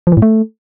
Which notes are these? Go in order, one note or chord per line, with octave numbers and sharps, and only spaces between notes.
F3
E3
A2
A3